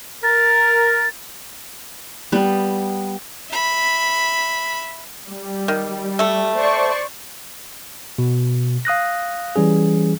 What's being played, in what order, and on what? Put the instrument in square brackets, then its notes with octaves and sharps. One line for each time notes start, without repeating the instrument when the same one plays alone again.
[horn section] A#4 [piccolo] A6
[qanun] G3 B3
[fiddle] E5 B5
[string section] G3
[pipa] D#3
A3 A4
[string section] C5 D5 C#6
[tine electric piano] B2
F5 D#6 F#6 A#6
E3 G3 C#4 G#4